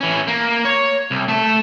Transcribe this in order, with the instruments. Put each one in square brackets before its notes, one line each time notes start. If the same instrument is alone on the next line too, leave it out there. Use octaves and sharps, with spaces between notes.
[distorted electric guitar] E3 C#4
A#3
C#5
C2
A3 A5